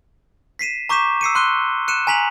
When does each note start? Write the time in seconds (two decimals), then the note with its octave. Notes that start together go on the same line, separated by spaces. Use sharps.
0.59 B6 C7 D#7 E7
0.89 A#5 C#6 D6 G6 B6 E7
1.21 E6 C7 C#7 D#7
1.35 C6 F#6 D#7 G7
1.88 F#6 C#7 D#7 E7
2.07 G#5 A#5 B6 F7 F#7